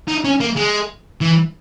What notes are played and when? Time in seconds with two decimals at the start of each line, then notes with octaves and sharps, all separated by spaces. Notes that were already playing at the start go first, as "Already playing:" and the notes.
0.08 D#4
0.25 C#4
0.40 A#3
0.56 G#3
1.21 E3